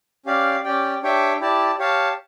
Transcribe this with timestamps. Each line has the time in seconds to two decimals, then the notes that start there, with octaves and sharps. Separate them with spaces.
0.26 C#4 G4 D5 F5
0.64 C#4 G4 D5 G5
1.03 D4 G4 C#5 E5 G5
1.41 E4 G4 D5 A5
1.79 G4 C#5 F5 A5